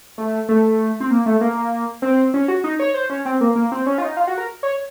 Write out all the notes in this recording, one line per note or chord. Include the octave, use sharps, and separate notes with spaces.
A3
A3
C4
A#3
A3
A#3
C4
C#4
F#4
D#4
C#5
C5
C#4
C4
A#3
A#3
C4
C#4
F4
D#4
F4
F#4
A#4
C#5